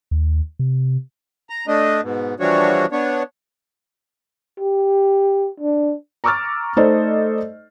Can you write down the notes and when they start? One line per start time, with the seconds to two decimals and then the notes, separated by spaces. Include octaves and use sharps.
0.11 D#2
0.59 C3
1.50 A#5
1.68 A3 D4 D#5
2.03 G#2 B2
2.40 E3 F3 G3 D4 F#4 C#5
2.92 B3 D4 C#5
4.59 G4
5.60 D4
6.24 A#5 C#6 D6 E6 F6 A6
6.77 A3 D#4 A4 C5 D5 D#5